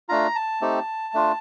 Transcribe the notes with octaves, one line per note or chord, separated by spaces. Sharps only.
A3 D4 F4 A#5
A5
A3 C4 D#4 G4
A3 D4 F4